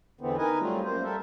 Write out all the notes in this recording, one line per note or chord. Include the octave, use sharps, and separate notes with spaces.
E2 D3 E3 B3 C4
D#4 A#4 B4 D#5 G#5
F#3 G3 A3 C4 F4
F#2 A#3 C5
G3 A4 A#4 E5